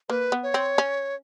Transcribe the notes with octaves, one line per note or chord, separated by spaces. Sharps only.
A#3 B4
B3
C#5
C4
C#4